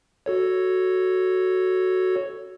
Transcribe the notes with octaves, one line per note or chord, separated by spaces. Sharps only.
F#4 A4 C#5